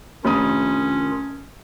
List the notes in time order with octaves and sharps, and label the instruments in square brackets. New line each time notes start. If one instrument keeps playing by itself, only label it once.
[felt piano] F1 D#6 [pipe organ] D#3 D4 F4 [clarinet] C#4